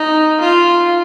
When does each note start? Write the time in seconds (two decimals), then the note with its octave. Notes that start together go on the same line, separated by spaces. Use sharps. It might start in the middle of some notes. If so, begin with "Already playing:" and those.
Already playing: D#4
0.40 F4